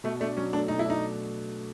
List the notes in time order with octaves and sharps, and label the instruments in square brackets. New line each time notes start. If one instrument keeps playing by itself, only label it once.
[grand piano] B2 [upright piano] A3
[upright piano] A3 [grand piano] D4
[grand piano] F#3 [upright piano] C#4
[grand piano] A3 [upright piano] D4
[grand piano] B2 [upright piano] D#4
[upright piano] E4
[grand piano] D4 [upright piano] D#4